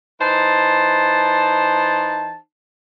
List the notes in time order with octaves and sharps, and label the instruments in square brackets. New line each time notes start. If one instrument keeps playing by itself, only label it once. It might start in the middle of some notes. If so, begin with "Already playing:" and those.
[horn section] E3 D#4 C5 A5